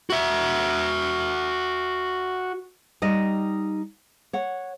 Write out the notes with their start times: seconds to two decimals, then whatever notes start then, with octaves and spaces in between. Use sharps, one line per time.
0.10 F#4 E5
3.02 G3 D#4 D#5
4.33 C#5 F#5